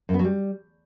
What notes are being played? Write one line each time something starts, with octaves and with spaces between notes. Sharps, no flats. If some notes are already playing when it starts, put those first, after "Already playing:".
F#2
B3
F#3
G3